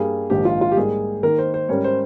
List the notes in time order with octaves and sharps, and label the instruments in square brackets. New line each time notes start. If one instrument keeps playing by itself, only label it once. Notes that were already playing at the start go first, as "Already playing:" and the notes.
Already playing: [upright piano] G2 G3 A#3 [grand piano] G#4
[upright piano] A#1 G#2 D#3 [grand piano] G4
[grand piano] F4
F4
G4
[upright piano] G#2 G3 A#3 [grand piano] G#4
[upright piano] D#3 A#3 D#4 [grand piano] A#4
[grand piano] C5
C5
[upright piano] G#2 G3 C#4 G4 A#4 [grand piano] C#5
[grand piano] C5